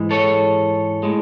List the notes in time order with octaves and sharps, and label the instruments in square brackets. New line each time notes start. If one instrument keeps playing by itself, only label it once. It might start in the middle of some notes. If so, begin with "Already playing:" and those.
Already playing: [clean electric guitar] G#2 E3 G#3
A4 C#5
A2 G#3